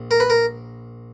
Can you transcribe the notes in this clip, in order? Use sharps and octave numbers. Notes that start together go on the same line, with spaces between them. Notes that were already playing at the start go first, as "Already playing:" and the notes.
Already playing: A#1
A#4
B4
A#4